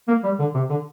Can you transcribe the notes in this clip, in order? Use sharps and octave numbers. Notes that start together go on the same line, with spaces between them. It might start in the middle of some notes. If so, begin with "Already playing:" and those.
A#3
G3
D3
C3
D3